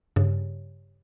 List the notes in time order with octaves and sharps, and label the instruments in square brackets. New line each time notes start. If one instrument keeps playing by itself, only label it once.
[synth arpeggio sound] G2 C#3